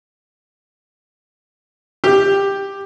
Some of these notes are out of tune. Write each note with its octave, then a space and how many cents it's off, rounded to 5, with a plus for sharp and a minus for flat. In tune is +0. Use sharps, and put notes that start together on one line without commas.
G4 +10